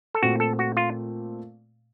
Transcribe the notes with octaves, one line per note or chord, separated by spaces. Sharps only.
A4
A#2 A3 C4 F#4
A4
F#4
F4